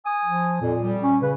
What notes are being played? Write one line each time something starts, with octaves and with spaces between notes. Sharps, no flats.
G#5 D#6
F3
F2 A#2
G3
C#4
C#3 B4